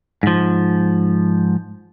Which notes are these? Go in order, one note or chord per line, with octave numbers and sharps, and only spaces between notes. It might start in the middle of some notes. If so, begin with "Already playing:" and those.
G#2 F3